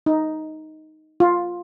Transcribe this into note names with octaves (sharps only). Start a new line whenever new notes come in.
D#4
F4